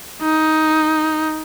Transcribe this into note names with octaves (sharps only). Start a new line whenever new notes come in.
D#4